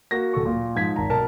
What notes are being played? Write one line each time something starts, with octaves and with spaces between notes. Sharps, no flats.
A#3 F#4 A#6
D1 A4 C#6
A#2
G#2 F3 G#6 B6
G#1 A5 A#5
B1 A#4 A5